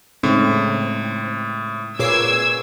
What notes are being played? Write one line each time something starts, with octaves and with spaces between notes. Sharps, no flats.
A2 C#3 G#3 C4 D#4
A#2 G#4 B4 C#5 D6 E6 G#6 C7